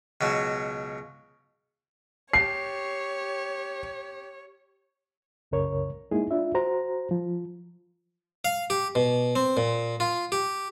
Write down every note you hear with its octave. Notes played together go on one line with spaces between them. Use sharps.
C#2 B2 F#3
G4 C#5 C7
C2 F#2 C#3 A#4 C#5
G#3 A#3 D#4 E4 G#4
D4 F4 E5
F#4 C5 A#5
F3
F5
G4
B2
C4
A#2
F4
G4